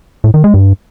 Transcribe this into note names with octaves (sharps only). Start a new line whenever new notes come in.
A2
D#3
G#3
G2